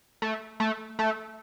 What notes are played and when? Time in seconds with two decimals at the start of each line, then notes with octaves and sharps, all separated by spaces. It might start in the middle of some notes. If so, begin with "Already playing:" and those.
0.22 A3
0.60 A3
0.99 A3